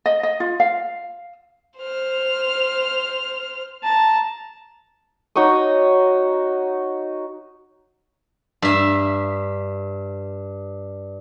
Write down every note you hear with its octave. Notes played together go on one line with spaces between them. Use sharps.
D#5
D#5
F4
F5
C5 F6
A5 A#5
D#4 F#4 C#5 D#5
G2 E5